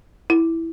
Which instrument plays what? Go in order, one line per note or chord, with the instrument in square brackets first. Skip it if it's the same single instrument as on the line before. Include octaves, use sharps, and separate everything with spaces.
[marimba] E4